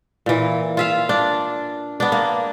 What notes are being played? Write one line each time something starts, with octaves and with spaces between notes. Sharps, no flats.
A#2 E3
F4 E5 F5
D4
B3 D4
A#3